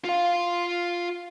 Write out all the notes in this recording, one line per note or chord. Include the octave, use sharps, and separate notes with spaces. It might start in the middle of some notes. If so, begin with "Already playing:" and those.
F4 F5